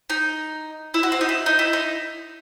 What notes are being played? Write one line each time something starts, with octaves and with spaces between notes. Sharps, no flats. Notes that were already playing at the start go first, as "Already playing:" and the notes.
D#4
E4
F#4
C4
D#4
E4
D#4
E4
D#4